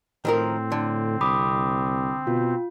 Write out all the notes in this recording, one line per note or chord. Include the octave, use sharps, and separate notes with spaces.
A2 D#3 F3 C4 A#4
D3
C2 B5 D6 D#6
B2 F4